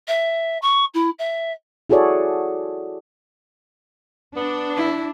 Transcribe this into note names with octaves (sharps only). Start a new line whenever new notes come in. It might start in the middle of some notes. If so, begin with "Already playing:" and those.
E5
C#6
E4
E5
E4 F#4 G#4 A4 C#5 D5
B3 D4
E4